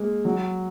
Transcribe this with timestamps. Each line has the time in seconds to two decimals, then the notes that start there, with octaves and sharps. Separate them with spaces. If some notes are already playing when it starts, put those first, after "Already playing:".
Already playing: G#3 A#3
0.25 F#3